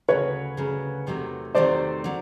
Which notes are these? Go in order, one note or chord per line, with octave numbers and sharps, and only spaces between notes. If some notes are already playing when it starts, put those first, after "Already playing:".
D2 C#3 F#3 B4 C#5
D2 C#3 F#3
E2 C3 D#3 F#3 A3
E2 C3 D#3 F#3 A3 C5 D5
D3 F#3